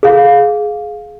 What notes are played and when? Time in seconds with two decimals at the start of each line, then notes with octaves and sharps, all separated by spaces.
0.03 G#4 F5